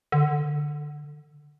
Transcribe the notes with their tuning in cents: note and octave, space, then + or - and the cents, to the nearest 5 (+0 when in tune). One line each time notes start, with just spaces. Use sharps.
D3 +15